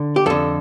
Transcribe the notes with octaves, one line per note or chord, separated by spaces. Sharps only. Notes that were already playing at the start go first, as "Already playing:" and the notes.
Already playing: D3
G4
F2 D3 A4